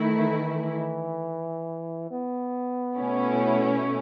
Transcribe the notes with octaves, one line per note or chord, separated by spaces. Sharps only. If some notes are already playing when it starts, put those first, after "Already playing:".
Already playing: D#3 A3 E4
E3
B3
B2 A3 C#4 E4